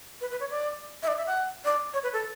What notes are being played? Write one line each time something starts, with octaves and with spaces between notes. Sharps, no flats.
B4
B4
C#5
D5
E5
D5
E5
F#5
D5
C#5
B4
A4